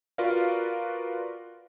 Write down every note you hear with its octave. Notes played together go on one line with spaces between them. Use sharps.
F4 F#4 A#4 B4 D5 F5